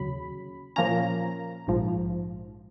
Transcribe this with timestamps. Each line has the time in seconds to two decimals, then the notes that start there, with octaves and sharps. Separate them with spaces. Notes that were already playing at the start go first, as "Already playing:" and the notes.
Already playing: D#2 C#3 F#3 B5
0.76 A#2 F3 A#3 C#4 A#5
1.67 A#1 G#2 F3